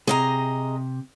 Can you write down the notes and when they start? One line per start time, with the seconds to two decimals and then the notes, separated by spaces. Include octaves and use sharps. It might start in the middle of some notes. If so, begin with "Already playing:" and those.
0.07 C3 G#4 D#5 A#5